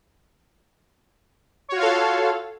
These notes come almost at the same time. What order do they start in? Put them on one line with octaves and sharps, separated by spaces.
C#5 F#4 F4 F5 A4